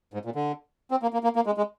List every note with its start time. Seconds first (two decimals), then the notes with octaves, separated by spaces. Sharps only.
0.14 G#2
0.25 A#2
0.35 D3
0.91 C4
1.02 A#3
1.13 A#3
1.24 A#3
1.36 A#3
1.46 G#3
1.57 G#3